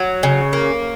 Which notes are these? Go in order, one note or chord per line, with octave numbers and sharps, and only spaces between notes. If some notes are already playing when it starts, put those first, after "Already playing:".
Already playing: F#3
C#3
A#3